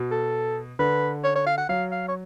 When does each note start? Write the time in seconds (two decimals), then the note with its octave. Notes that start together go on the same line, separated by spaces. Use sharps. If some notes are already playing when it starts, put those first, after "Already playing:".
Already playing: B2
0.11 A4
0.79 D3 B4
1.24 C#5
1.36 C#5
1.47 F5
1.58 F#5
1.69 F#3 F5
1.92 F5
2.08 C#5